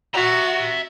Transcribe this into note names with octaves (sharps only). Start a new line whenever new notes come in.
F#4 E5 A#5